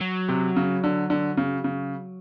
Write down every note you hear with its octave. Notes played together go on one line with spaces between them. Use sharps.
F#3
C3
C#3
D3
D3
C#3
C#3